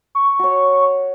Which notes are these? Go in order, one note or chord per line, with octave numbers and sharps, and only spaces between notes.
C#6
F#4 C#5